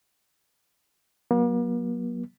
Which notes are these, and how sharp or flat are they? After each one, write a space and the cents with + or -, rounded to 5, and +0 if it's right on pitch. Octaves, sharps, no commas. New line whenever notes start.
F#3 +0 A#3 +45